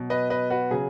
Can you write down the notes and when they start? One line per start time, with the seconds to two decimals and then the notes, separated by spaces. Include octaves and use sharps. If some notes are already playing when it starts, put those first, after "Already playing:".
Already playing: B2 F#3
0.10 B4 D#5
0.30 B4 D#5
0.50 F#4 B4
0.71 C#3 F#3 G#4